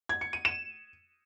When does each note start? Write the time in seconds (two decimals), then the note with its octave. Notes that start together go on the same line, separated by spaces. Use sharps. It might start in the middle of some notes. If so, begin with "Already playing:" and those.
0.09 G#6
0.21 C#7
0.33 D#7
0.45 E7